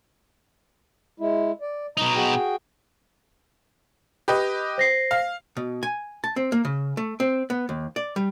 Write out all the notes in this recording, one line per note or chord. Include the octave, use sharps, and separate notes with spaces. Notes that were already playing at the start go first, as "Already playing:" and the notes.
G#3 E4
D5
B2 D#4 D#5 A#5
F#4 G#4 G5
G4 B4 D#5
C5 A#6 C7
F5
B2
G#5
A5
C4
A#3
C#3
A3
C4
B3
D#2
D5
G3